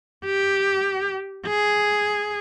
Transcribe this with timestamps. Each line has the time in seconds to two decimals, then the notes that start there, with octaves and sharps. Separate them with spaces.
0.25 G4
1.47 G#4